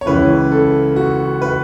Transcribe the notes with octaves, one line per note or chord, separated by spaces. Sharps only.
C#5
C#2 C#3 E3 B4
A4
F#4
B4